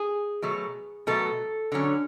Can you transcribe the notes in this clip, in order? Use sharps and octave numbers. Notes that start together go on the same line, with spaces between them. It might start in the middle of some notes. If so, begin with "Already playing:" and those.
Already playing: G#4
B2 F#3 A3
B2 F#3 A3 A4
D3 F#3 C#4